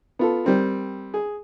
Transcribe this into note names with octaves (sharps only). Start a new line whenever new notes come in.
B3 F4 A4
G3 C4 A#4
G#4